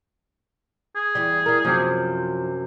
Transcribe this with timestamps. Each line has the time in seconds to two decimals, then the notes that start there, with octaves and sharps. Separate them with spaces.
0.96 G#4
1.15 E2 G3
1.46 G3 A#4
1.65 F#2 C3 F3